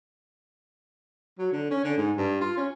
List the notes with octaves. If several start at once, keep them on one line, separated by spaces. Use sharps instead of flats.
F#3
D3
C#4
D3
G#2
G2
F4
C#4